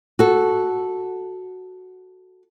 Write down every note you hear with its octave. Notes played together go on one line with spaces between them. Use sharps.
F#4 A4